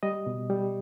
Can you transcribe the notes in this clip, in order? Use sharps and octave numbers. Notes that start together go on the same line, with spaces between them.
G3 D#5
B2
G3